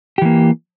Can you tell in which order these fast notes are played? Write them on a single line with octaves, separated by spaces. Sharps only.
G4 E3 A#3